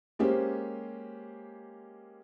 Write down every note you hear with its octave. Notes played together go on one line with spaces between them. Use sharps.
G#3 A#3 C#4 G4 C5